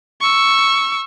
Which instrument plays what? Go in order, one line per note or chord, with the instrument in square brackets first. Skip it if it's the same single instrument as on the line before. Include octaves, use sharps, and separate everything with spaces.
[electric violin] C#6 E6